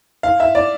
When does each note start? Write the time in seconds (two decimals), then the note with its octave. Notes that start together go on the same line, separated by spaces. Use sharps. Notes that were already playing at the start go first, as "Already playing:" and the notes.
0.23 F5
0.40 E5
0.55 D5